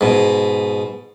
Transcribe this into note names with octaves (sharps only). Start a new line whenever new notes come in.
G#2 B2